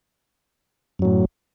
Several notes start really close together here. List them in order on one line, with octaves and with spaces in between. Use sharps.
F#2 F#3 A2